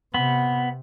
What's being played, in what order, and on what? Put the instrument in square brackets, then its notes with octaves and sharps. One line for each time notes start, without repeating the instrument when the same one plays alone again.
[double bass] C3 [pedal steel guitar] B3